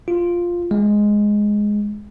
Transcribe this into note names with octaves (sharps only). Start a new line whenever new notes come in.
F4
G#3